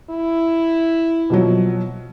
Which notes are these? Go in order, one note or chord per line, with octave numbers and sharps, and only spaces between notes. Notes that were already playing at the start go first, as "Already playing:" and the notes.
E4
B2 F3 F#3